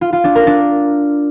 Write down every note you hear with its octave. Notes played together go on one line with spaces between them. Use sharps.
F4
F4
D4
A#4
D4